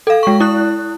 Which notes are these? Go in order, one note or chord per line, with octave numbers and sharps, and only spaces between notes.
A4 F5
G#3 C#6
E4 F#6